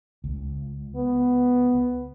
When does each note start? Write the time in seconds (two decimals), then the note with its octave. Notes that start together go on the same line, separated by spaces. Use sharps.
0.24 C#2
0.95 B3